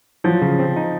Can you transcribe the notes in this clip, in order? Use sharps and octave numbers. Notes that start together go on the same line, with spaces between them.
F3 F#3
C#3
C4
D#4